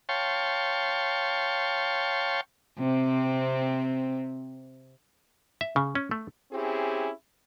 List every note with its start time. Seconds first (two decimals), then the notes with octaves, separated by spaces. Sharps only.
0.09 C#5 F5 G5 A5 C6 C#6
2.79 C3 C4
5.61 E5
5.76 C#3
5.95 C#4
6.11 A3
6.51 C4 C#4 E4 G4 G#4